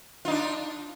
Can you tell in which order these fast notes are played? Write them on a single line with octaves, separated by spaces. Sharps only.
F4 D#4 D4